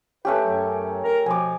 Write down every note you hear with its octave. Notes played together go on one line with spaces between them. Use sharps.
A3 C#4 G4 B4
F#2 F#3
A#4 A#5
B2 F3 G#5 D6